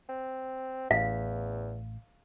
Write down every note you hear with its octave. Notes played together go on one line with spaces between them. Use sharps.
C4
A1 E2 A2 F5